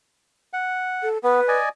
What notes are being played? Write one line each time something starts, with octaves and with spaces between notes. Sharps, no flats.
F#5
A4
B3 B4
D5 D#5 G#5